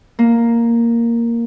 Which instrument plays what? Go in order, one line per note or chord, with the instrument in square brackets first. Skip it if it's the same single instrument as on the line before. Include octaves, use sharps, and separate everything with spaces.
[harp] A#3